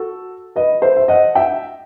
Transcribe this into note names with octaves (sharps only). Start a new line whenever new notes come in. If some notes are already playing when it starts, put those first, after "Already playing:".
Already playing: F#4 A4
B4 D#5
C5 E5
E5
D#5 F#5
E5 G5